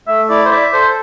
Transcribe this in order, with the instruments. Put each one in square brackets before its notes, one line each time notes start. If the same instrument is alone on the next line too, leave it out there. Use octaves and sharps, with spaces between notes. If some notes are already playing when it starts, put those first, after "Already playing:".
[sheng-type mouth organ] A3 [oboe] E5
[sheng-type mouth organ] E4 [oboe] D5
[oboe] C5
[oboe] D5 [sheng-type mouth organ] E5
[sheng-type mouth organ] A4 [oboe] C5